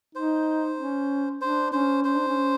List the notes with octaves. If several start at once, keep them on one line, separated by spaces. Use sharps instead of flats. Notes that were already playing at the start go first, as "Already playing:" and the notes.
D#4 C5
C#4
D4 C5
C#4 C5
C#4 C5
D4
C#4